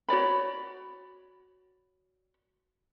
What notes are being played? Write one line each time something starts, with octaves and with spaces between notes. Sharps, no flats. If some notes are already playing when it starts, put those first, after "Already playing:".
F#4 C#5 D5 B5